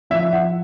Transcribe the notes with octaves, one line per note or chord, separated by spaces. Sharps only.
F3 E5
F#5